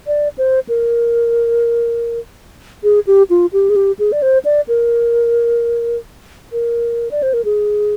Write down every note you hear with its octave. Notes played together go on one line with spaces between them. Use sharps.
D5
C5
A#4
G#4
G4
F4
G4
G#4
G4
G#4
D5
C5
D5
A#4
A#4
D5
C5
A#4
G#4